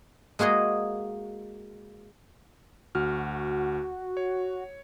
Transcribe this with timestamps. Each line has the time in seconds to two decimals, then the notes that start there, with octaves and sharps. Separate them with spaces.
0.39 G#3 A#3 F#4 G#4 D#5
2.95 D2 F#4 F6
4.17 C#5